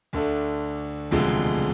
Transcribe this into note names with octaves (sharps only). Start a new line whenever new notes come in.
D2 D3 A3 D4
E1 D2 C3 F3 G#3